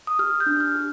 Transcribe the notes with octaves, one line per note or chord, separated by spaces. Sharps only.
D#6
G4 F6
G6
D4
F6
G4